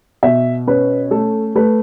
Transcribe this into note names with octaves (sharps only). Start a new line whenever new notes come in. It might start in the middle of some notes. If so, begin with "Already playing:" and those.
B2 E5
C#4 B4
A3 A4
A3 B4